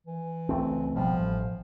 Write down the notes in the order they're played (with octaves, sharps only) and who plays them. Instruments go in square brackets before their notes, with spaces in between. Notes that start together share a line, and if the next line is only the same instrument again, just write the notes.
[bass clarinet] E3
[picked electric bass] C#2 A3 C4
[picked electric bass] G#1 B2 G3 [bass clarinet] F3
[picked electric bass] A1